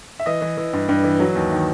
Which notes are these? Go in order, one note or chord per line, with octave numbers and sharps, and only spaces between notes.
E5
E3 D#5
E3
E3
G2
G2
E3
F#3
D#2
D#3